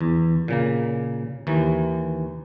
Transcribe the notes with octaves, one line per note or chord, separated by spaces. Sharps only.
E2
A#2 C#3 A#3
D#2 E3